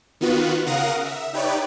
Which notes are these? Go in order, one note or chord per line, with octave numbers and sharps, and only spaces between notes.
D#3 B3 F4 F#4 B4
C#3 A#4 F5 F#5 D#6 A#6
E5
D#4 G4 B4 C#5 D5